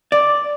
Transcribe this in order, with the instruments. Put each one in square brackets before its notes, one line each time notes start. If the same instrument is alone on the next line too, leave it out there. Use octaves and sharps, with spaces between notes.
[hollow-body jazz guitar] D5